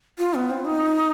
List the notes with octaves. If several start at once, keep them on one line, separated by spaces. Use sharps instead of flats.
F4
B3
C4
D#4